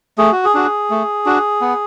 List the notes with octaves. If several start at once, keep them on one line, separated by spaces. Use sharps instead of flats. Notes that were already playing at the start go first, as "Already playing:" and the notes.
A3 G#4
F#4
G#4
D4 F#4
A3
D4 F#4
B3